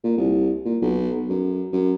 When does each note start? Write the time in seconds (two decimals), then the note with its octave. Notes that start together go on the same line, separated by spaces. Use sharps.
0.03 A#2
0.17 C2
0.65 A#2
0.81 B1
1.29 F#2
1.73 F#2